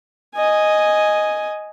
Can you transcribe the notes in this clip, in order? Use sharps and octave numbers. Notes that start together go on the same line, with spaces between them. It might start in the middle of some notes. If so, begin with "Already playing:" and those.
D#5 G#5